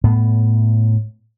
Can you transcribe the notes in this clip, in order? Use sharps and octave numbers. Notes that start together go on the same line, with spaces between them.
A2 B3